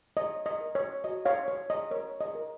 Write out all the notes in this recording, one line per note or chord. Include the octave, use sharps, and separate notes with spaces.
C#5 D#5
D#5
A#4
C#5
F#4 D#5
C#5 F5
C#5
D#5
A#4 C#5
D#5
A#4